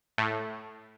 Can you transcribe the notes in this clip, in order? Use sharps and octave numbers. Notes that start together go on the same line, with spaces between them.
A2